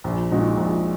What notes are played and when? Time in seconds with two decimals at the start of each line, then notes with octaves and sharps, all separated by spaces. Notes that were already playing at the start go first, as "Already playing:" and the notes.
0.04 A#1
0.31 A#2 G#3 D#4 F#4
0.57 A#1